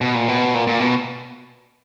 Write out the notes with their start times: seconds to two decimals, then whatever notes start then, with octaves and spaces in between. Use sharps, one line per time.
0.01 B2
0.15 A#2
0.28 B2
0.55 A#2
0.67 A#2
0.80 B2